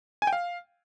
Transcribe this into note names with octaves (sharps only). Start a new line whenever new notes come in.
G#5
G5
F5